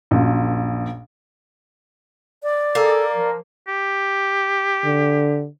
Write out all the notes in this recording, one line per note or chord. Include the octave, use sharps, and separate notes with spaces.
A#1 F#2 A#2
D5
A#3 G#4 A4
F3 A#4
G4
D3